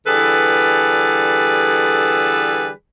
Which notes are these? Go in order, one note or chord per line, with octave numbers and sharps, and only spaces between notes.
D3 E3 G3 G#4 A4 B4